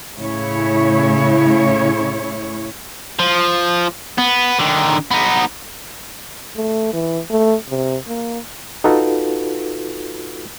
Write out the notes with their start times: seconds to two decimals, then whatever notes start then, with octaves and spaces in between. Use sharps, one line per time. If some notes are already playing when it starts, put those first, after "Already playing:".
0.17 A2 C#3 E4 C#5
3.19 F3
4.18 B3
4.59 D3 D#3
5.11 B3 D#4
6.56 A3
6.93 E3
7.30 A3
7.70 C3
8.08 A#3
8.84 D#4 F4 F#4 A4 B4